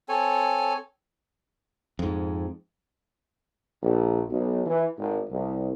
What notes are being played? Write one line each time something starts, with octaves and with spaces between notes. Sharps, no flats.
C4 A4 C#5 G#5
F2 G#2
A#1
B1
E3
G#1
C2